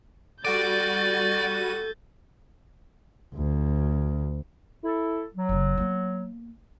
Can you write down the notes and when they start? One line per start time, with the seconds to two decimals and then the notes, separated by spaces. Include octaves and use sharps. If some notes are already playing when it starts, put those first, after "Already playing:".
0.45 G3 F#4 A4 D5 G6 A6 D#7
3.35 D2
4.84 E4 A4
5.35 F#3
5.49 F#1 C#3
5.77 A#3 B3